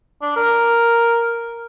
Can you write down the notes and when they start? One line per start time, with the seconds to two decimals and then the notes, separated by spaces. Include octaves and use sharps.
0.22 D4
0.36 A#4